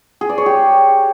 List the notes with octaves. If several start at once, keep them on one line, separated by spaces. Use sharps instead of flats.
G#4
D5
C#5
G4